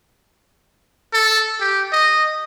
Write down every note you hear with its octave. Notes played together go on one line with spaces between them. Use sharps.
A4
G4
D#5